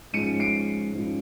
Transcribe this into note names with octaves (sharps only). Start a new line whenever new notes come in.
G#2 F3 G#3 C#4 C#7 D#7
C7 D7
G#2 F3 G#3 C#4